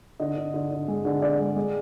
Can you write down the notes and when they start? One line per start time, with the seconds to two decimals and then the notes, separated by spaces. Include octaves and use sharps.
0.20 D3 D#5
0.37 D3
0.54 D3
0.71 D3
0.88 G#3
1.05 D3
1.22 D3 D5
1.39 G#3
1.56 G#3